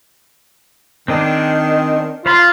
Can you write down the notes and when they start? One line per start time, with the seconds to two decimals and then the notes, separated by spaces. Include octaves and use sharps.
1.08 D#3 C4 D4 G#4
2.26 F4 C5 F5 B5